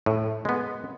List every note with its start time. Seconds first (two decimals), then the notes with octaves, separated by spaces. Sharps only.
0.06 A2
0.45 G#3 B3